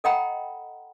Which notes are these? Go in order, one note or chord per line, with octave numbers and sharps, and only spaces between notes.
A4 D#5 F#5 G5 A#5 B5